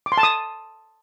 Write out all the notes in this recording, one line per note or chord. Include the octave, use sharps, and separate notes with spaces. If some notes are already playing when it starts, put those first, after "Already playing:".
D6
C6
A5
D#6